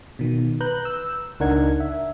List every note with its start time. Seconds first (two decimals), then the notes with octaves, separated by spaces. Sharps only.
0.19 B2 D#3
0.60 B4 A#5 F#6 G6
0.85 E6
1.40 C#2 D4 D#4 A#4 F#5 G#6
1.80 E5